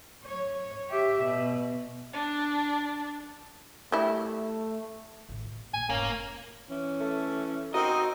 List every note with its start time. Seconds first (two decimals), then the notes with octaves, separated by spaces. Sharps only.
0.24 C#5
0.90 G4 E5
1.23 B2
2.14 D4
3.92 G3 A3 E4
5.29 A1 D#3
5.44 A#2
5.74 A#1 A#2 G#5
5.90 F1 G#2 A#3 C#4
6.69 E3 C#4
7.00 A3
7.74 C4 D#4 F#4 A#4 D#5